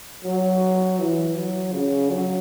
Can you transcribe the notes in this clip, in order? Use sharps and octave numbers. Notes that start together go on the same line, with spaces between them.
F#3
E3
F#3
C#3
F#3